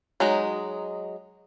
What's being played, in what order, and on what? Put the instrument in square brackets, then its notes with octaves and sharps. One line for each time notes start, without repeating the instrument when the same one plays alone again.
[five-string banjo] F#3 G#3 D#4